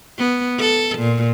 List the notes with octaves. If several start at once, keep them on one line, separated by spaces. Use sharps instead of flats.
B3
A4
A#2